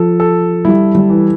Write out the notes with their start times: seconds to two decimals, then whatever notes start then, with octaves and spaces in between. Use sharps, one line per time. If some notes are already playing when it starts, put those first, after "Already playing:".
Already playing: F3 A4
0.20 A4
0.65 G3 E4
0.95 G3
1.10 E3